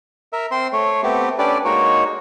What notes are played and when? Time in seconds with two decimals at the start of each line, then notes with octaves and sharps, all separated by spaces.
0.33 A#4 E5
0.51 C4 C5 C6
0.73 A3 C#5
1.03 A3 B3 C4 G4
1.39 C#4 D4 G4 A4 B4 D5
1.65 G#3 A#3 D#4 F#4 C#5